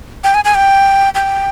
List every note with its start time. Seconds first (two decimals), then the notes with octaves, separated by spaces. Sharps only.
0.24 G5
0.34 G#5
0.45 G#5
0.55 G5
1.15 G5